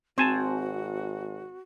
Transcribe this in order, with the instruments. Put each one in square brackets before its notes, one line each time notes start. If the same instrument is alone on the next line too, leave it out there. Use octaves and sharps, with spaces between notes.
[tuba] G#1 [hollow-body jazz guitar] C4 [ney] F#4 [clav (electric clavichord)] C5 G#5 A5